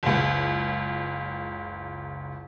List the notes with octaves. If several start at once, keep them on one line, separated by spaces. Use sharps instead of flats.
F#1 C#2